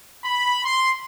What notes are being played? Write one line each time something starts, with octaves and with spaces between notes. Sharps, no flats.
B5
C6